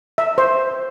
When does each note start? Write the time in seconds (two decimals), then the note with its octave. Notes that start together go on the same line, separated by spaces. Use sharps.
0.18 E5
0.38 C5